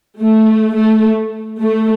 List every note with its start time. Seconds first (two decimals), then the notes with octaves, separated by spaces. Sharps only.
0.20 A3
0.76 A3
1.61 A3